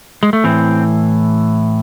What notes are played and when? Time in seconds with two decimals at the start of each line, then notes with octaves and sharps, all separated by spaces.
0.23 G#3
0.33 A3
0.44 A2 E3 C4